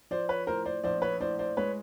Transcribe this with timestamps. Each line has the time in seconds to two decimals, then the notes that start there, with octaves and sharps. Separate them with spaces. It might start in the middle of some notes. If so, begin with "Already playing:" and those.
0.11 F3 C5 D5
0.29 B4 C#5
0.47 A2 A#4 C5
0.65 C5 D5
0.84 A#1 C5 D5
1.02 B4 C#5
1.20 A2 C5 D5
1.39 C5 D5
1.57 G#3 B4 C#5